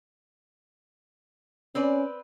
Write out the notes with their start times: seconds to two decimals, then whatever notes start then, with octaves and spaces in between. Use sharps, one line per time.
1.75 C4 C#4 B4 D5